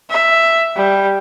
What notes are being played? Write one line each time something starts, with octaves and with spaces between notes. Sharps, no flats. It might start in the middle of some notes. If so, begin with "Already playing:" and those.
E5
G3